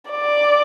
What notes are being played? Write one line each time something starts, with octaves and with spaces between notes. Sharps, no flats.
D5